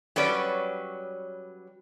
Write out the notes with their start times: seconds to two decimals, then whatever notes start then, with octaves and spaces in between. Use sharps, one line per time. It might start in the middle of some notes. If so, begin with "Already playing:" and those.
0.16 F#3 G3 C#4 B4 D5